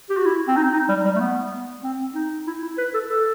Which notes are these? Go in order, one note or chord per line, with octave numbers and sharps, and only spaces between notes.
G4
F#4
E4
C4
D#4
D#4
G3
G3
A3
B3
C4
D#4
E4
E4
B4
A4
A4